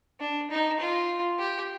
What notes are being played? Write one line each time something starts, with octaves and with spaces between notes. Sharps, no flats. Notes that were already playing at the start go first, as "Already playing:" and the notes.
D4
D#4
F4
G4